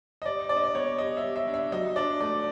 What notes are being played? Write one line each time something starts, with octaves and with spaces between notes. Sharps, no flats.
D#5
G3 D5
D4 D5
D#5
D5
B3 C#5
G3 D#5
E5
G3
E5
D4
E5
F#3 D#5
D4 D5
A3 D5